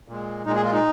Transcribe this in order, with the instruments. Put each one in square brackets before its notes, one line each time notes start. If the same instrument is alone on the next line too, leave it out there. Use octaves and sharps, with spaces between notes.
[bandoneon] A#2 G#3
A#2 G#3 D#4
G#4
F4
D#4